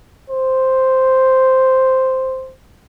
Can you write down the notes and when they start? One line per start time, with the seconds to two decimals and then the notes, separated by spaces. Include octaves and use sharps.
0.30 C5